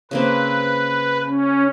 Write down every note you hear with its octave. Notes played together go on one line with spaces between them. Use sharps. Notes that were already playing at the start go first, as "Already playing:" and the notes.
C#3 A#3 C4 B4
C#4